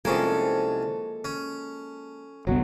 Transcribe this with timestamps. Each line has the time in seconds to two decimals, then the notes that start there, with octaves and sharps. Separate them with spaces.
0.05 C2 F3 G#3 A#3 C#4 A4 G#5
1.25 C#4
2.47 G1 C2 F#3 B3 F#4